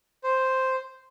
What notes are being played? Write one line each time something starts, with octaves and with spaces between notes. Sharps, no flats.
C5